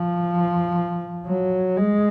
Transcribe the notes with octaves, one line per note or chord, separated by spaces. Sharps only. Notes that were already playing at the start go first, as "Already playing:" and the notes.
Already playing: F3
F#3
G#3